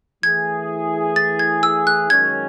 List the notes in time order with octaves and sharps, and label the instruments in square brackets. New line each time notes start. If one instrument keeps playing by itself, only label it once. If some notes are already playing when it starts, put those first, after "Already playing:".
[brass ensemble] E3 A3 E4 G#4 [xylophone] G#6
[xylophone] A6
G#6
E6
F#6
[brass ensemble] F#2 D#3 G#3 C#4 [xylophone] G#6